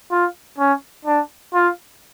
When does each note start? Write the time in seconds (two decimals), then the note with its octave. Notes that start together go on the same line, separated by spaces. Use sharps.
0.11 F4
0.58 C#4
1.05 D4
1.54 F4